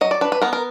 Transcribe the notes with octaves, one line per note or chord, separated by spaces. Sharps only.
F#3 D#5
D5
D4 B4
B4
B3 A#4
A#4